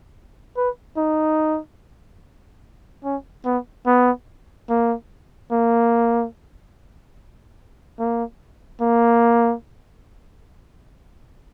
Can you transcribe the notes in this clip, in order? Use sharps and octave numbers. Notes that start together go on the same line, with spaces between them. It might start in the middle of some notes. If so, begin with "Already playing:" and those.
B4
D#4
C#4
B3
B3
A#3
A#3
A#3
A#3